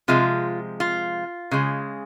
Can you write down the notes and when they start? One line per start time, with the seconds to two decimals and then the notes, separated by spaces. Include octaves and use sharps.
0.08 C3 F3 G#3 F4
0.80 F4
1.51 C#3 G#3